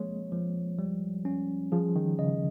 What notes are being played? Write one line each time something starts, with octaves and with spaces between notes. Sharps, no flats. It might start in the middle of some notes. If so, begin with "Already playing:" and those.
Already playing: F3 G#3 A#3 C4 C#5
F3
G3
C#4
F3 G#4
D#3
C#3 D#5